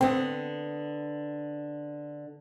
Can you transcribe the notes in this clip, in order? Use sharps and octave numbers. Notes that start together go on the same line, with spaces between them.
D3 B3 C4